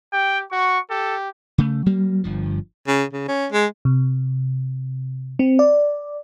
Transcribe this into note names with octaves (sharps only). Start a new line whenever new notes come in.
G4 G5
F#4 C#6
G4 A4
C#3 A3
F#3 G3 A#3
G1 G2 F3
C#3
C#3
C#4
G#3
C3
C4
D5